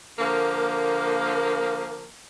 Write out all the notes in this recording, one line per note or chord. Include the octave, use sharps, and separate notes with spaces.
D3 F3 A#3